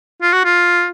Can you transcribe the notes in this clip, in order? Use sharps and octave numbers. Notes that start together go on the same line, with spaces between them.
F4
F#4
F4